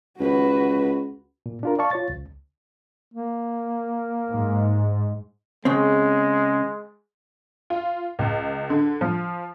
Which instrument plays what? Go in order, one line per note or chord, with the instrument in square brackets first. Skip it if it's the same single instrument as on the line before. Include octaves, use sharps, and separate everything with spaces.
[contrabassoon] C#2 [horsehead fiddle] F#4 B4
[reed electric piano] A#2
D4 F4 A#4
D5 F5 A5 C#6
F4 C#5 A6
C#2
[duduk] A#3
[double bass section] G#2
[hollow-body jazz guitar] C#3 C4 [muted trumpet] G#3
[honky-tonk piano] F4
C#2
D3
F3